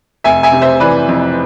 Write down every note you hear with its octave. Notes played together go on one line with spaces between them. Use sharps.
F1 E5 G#5
E5 G#5
C3
C5 E5
E3 B4 D5
F2